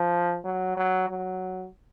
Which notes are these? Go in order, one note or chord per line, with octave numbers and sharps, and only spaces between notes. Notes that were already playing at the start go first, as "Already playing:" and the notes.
Already playing: F3
F#3
F#3
F#3